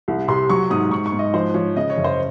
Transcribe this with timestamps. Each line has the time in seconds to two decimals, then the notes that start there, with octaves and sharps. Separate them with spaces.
0.08 C2
0.28 C3 C6
0.50 F#3 C#6
0.70 G#2 D#6
0.91 G#2 C#6
1.06 C#6
1.12 G#2
1.19 D#5
1.34 F3 C5
1.54 F3 C#5
1.76 C#3 D#5
1.90 C#5
1.97 F#1
2.04 C5